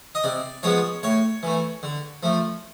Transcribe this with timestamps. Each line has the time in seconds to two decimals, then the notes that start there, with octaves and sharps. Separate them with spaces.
0.15 D#5
0.24 C3 D5
0.63 F3 G#3 B3 C#5
1.03 A2 C#5
1.43 E3 A3
1.83 D3
2.23 F3 A3